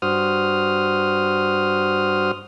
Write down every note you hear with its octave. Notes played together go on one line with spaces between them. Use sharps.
G2 F#4 C5 D#6 F6